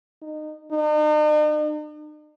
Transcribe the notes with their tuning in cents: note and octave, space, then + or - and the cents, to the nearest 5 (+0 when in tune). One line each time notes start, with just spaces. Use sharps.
D#4 -25
D#4 -45